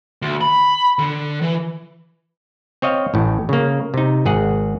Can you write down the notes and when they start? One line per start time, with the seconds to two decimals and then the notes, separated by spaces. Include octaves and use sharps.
0.22 D2
0.41 B5
0.99 D3
1.42 E3
2.82 C4 C#5 D#5 F5
3.14 A1 A2
3.49 C#3 A#3
3.94 C3 D#4
4.26 G#1 G#4 F#5